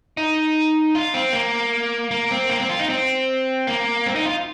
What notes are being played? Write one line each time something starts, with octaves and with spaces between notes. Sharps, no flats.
D#4
F4
C4
A#3
A#3
C4
A#3
C4
F4
D#4
C4
A#3
C4
D#4
F4